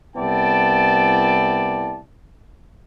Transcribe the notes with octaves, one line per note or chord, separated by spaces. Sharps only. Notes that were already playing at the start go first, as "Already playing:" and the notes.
C2 B3 E4 D5 G5 A5